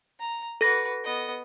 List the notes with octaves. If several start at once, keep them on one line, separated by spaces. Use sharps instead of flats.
A#5
F#4 A4 B4 A#6
B3 D#5